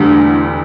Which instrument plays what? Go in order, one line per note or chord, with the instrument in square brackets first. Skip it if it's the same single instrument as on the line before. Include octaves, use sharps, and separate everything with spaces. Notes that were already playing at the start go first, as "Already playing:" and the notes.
Already playing: [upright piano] E1 D2 D3 G3 [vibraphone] D4
[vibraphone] E4